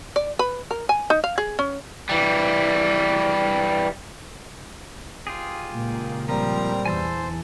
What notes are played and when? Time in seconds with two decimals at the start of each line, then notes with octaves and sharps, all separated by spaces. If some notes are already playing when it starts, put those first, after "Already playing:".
0.16 D5
0.39 B4
0.71 A#4
0.89 G#5
1.10 D#4
1.24 F5
1.38 G#4
1.59 C#4
2.09 E3 G3
5.27 F4 G4 G#4
5.70 C#2 A#2 A#3
6.29 F3 G3 C4 A#4 A#5
6.86 E2 E3 C5 G#5 A5 E6